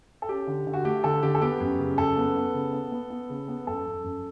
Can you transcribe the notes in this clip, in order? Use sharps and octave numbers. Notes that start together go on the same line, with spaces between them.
A4
C#4 G4
D3
D3
F#4
A3 G4
D3 A4
D3 G4
A4
B3 G4
F#2
C#3
F#2 A4
B3
B3
C#3
B3
B3
B3
C#3
B3
F#2 A4
F#2
F#2